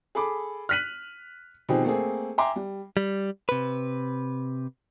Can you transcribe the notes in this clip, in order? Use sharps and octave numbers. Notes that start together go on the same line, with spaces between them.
G#4 A4 B5 D6
F6 F#6 B6 D#7 F#7
B2 D#3 F3 C4 G4 G#4
A3 A#3 C4 G#4
E5 G5 G#5 A#5 C6 D6
G3
G3
C3 B4